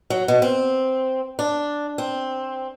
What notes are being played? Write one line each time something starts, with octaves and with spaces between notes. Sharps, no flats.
F#3
B2
C4
D4
C4